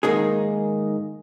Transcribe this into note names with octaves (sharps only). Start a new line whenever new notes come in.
G#2 D#3 A#3 D#4 G#4